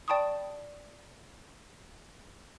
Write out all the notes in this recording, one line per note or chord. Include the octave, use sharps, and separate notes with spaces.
D5 G5 A5 B5 C#6 D#6